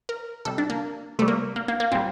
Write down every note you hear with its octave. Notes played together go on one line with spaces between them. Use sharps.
A#4
C3 G3 A4
D4
A#3
C3 G3 A3
A#3
A#3
A#3
A#3
A#2 G3 C4